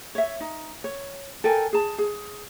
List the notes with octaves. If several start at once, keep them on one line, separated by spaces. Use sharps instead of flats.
C#5 E5
D#4
C#5
A4 A#4 G5 G#5
G#4 A5
G#4